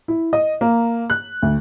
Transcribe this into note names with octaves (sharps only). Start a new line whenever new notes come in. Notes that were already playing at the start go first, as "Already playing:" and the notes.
E4
D#5
A#3
F#6
D2